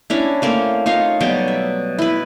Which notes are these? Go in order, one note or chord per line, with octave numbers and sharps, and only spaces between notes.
C#4 D4 E4
A3 A#3 C4 C#4
D#4 F4 C#5 F5
B2 F#3 G3 G5
E5
E4 B4